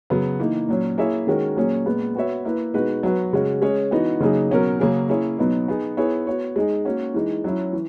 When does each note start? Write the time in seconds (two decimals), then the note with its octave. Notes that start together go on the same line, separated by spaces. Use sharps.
0.10 C#3 F#3 B3
0.40 E3 A#3 D#4
0.68 A#2 F#3 C#4
0.98 A#3 E4 G#4 C#5 E5
1.27 D#3 G#3 C#4 F#4 A#4
1.56 A#2 F#3 A#3 C#4 G#4
1.86 A#2 G#3 B3
2.15 B3 F#4 C#5 E5
2.45 A#3 E4 B4
2.74 B2 G#3 D#4 F#4 B4
3.03 F#3 B3 F#4 B4
3.33 C#3 G#3 C#4 F#4
3.62 G#3 C#4 G#4 C#5
3.91 E3 B3 D#4 F#4
4.20 C#3 F#3 A#3 D#4 G#4
4.51 B2 F#3 C#4 F#4 A#4
4.80 C#3 F#3 A#3 C#4 G#4
5.09 A#3 C#4 E4 G#4 C#5
5.38 B2 F#3 B3 D#4
5.68 B3 D#4 G#4
5.97 B3 E4 G#4 C#5
6.27 B3 F#4 C#5
6.56 G#3 D#4 G#4
6.85 A#3 C#4 F#4
7.14 E3 G#3 D#4
7.44 F#3 C#4 E4
7.73 E3